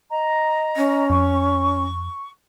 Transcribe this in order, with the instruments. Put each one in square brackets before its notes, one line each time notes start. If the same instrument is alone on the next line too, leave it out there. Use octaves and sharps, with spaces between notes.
[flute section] D#5 A#5
[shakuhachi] C#4
[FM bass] F2 [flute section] C#6